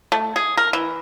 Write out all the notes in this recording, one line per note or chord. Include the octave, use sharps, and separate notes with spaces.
A3
G#4
A#4
E3